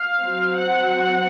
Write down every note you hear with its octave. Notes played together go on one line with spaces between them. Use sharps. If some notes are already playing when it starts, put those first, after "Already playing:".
Already playing: F5
F#3 C4
F#5